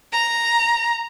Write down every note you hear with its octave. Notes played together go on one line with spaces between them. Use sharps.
A#5